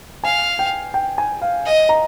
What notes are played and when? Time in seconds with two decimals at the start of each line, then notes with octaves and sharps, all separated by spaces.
0.24 F5 G#5
0.59 G5
0.94 G5
1.18 G#5
1.42 F5
1.66 D#5
1.89 A#5